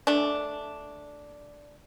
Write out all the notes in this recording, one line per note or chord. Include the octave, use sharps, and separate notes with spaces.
A3 D4